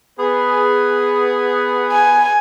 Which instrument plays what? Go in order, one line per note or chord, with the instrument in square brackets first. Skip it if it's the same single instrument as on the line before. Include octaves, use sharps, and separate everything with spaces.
[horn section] B3 G#4 B4
[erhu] G#5